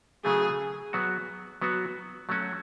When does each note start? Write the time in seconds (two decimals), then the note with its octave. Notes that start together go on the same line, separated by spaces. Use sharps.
0.24 C#3 F#3 A3 G#4
0.93 F#3 B3 F#4
1.61 F#3 B3 F#4
2.29 F#3 A3 C#4 F#4